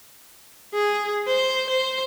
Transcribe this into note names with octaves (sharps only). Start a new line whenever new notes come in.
G#4
C5
C5